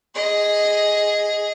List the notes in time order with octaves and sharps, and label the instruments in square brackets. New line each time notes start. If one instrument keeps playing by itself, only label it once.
[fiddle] G#4 D#5